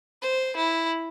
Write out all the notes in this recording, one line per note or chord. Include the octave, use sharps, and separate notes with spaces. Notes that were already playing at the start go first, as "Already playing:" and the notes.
C5
E4